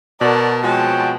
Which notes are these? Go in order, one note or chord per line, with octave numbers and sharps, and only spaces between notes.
B2 F#4 A#4 D5 A5
F3 G#3 C4 F#4 C#5 G5 A5